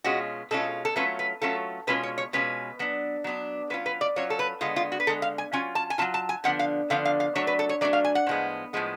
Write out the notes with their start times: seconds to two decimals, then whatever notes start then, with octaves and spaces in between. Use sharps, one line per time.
0.04 B2 G#3 C#4 F4 F#4
0.51 B2 G#3 C#4 F4 A4
0.85 A4
0.96 F#3 A3 C#4 F4 B4
1.19 B4
1.42 F#3 A3 C#4 F4 A4
1.87 B2 G#3 C#4 F4 B4
2.03 C#5
2.18 C#5
2.33 B2 G#3 C#4 F4 B4
2.79 F#3 B3 D4
3.24 F#3 B3 D4
3.70 F#3 C#4 F4 B4
3.86 B4
4.01 D5
4.16 F#3 C#4 F4 C#5
4.30 A4
4.39 B4
4.61 D3 G#3 B3 F4
4.76 F4
4.92 F#4
5.00 B4
5.07 D3 G#3 B3 A4
5.22 F5
5.38 G#5
5.53 F#3 C#4 F4 G#5
5.75 A5
5.90 G#5
5.98 F#3 C#4 F4 A5
6.14 A5
6.29 G#5
6.44 D3 F3 B3 D4 F#5
6.59 F5
6.90 D3 F3 B3 D4 F5
7.05 F5
7.20 F5
7.35 F#3 A3 D4 C#5
7.47 B4
7.59 A4
7.69 C#5
7.81 F#3 A3 D4 D5
7.93 F5
8.05 G#5
8.15 F#5
8.27 A2 F3 G#3 B3
8.73 A2 F3 G#3 B3